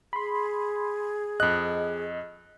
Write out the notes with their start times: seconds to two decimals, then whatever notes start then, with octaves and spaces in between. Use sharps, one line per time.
0.13 G#4 B5 C6
1.40 F2 D#5 F#6